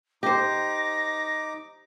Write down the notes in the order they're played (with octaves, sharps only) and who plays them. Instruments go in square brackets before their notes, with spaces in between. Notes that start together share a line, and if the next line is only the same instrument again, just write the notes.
[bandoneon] D#4 D6 [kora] G4 C5 [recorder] A#6